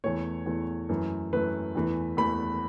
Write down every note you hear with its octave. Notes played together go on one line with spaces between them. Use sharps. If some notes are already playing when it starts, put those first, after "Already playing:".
E2 E3 A3 C#5
E2 E3 A3
F#2 E3 A3
F#2 E3 A3 B4
E2 E3 A3
E2 E3 A3 B5